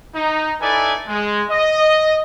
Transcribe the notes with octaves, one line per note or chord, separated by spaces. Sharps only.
D#4
D#4 E4 A4 B4 D5 G#5
G#3
D#5